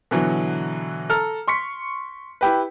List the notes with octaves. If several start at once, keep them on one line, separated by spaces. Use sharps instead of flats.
B2 D3 E3 F#3
A4 A#5 F6
C6 C#6 B6 C#7
E4 G4 B4